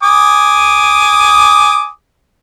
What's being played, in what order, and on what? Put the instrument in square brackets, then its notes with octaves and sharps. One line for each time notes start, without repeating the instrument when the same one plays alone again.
[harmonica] G#5 D6 D#6